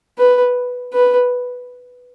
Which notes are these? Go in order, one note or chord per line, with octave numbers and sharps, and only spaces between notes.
B4
B4